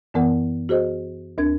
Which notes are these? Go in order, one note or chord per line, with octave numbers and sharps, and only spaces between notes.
F#2 E3 B3 A#4 F#5
F#4 G#4 C5 D#5
D2 D4 A#4 G#6